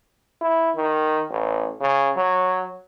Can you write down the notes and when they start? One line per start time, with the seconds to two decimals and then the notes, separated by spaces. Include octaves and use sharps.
0.41 E4
0.75 D#3
1.30 A1
1.81 C#3
2.16 F#3